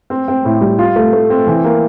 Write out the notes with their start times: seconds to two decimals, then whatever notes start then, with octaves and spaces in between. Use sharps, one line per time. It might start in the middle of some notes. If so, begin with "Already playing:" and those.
0.10 C4
0.28 C4
0.45 A2
0.61 G3
0.79 F4
0.96 A3
1.13 A3
1.30 C4
1.47 E3
1.64 A#3